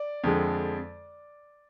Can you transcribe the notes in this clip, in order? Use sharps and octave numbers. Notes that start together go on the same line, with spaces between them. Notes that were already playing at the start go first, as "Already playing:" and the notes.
Already playing: D5
F2 D3 G#3